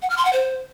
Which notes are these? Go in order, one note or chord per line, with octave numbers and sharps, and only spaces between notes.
F#5
F6
C6
F#5
C5